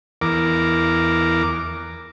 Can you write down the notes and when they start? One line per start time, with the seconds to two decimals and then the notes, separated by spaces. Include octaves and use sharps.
0.21 E2 A#4 D6